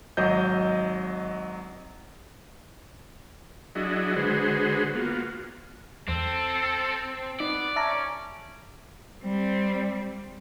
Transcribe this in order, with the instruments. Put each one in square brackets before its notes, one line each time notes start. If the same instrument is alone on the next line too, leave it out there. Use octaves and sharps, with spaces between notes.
[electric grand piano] G#1 F#3 D#5 G6
[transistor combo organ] F#3 D4 E4 F#4 G#4 D#5
D3 G#3 F#4 G#4 B4 C5
A#3 B3 F4 F#4
[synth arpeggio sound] E2 [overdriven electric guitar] C4 [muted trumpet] A4
[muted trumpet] B3 [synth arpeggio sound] D#4 [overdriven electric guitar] D5
[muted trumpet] C#4 [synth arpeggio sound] E5 A5 A#5
[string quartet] G3 C4